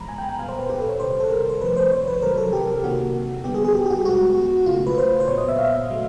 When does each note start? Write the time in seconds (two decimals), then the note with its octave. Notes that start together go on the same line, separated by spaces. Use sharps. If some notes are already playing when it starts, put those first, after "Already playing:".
Already playing: A2 E3 G#3 B3 A#5 B5
0.08 G#5
0.18 G5
0.28 G5
0.39 A#2 G3 B3 F5
0.49 C5
0.59 B4
0.70 G4
0.80 A4
0.89 C#5
1.00 C3 D#3 G3 C5
1.10 C5
1.20 A4
1.30 A#4
1.49 C5
1.61 C3 F3 A3 B4
1.77 C5
1.92 C#5
2.08 B4
2.22 C3 D#3 F#3 A#4
2.37 A4
2.53 G4
2.84 C3 D#3 F#3 A#3 F#4
3.44 D3 G3 B3 G4
3.55 G#4
3.65 G#4
3.75 G4
3.86 G4
3.90 F#4
4.05 B2 G#3 B3 F#4
4.66 C#3 F#3 A3 F4
4.87 B4
4.98 C5
5.20 C5
5.28 A#2 F#3 B3 C#5
5.38 D#5
5.48 E5
5.58 F5
5.89 C#3 F#3 A3